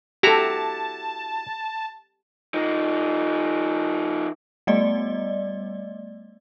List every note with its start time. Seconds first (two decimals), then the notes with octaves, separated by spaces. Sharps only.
0.23 E4 F#4 G4 A4 A5 A#5
2.54 F3 D#4
4.67 G3 A3 B3 D5 D#5